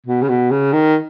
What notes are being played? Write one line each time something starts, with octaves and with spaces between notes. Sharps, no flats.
B2
C#3
B2
C#3
D#3